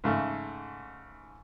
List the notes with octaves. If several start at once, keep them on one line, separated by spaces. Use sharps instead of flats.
G#2 C#3 A3